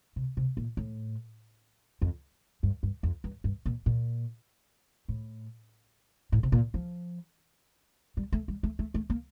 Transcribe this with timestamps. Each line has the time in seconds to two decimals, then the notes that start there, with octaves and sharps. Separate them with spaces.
0.16 C3
0.37 C3
0.57 A#2
0.77 A2
2.02 F2
2.63 G2
2.83 G2
3.03 F2
3.24 G2
3.44 G2
3.66 A#2
3.86 A#2
5.08 A2
6.32 A2
6.43 C3
6.52 A#2
6.74 F3
8.17 G3
8.32 A3
8.48 G3
8.63 A3
8.79 A3
8.94 A3
9.10 A#3